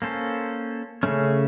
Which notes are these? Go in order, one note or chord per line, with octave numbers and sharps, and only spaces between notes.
A#3 C#4 A4 C5
C#3 A3 C#4